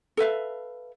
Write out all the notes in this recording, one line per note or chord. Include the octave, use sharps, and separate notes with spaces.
A4 B4 E5 F5